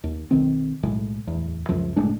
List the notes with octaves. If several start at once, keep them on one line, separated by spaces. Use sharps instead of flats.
D#2
B1 D#3 C4
B1 A2 G#3
D1 E2
C#2 F#2 F3
F#1 A2 G#3 D4